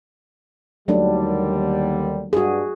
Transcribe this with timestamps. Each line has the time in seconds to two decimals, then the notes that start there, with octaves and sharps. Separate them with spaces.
0.88 D#2 D3 F#3 G3 A3 D4
2.33 G2 F#4 G#4